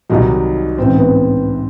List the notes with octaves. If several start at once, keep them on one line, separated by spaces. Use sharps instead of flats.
C2 C3 D#3 F#3 D#4
A1 G#2 E3 C4
B3